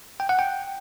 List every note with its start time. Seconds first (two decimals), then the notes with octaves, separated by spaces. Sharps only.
0.20 G5
0.29 F#5
0.39 G5